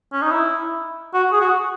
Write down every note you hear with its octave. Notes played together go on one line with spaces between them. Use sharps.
C#4
D#4
E4
F#4
G#4
F#4